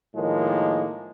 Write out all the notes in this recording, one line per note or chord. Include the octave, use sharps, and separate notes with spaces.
A2 D#3 F3 G#3 A#3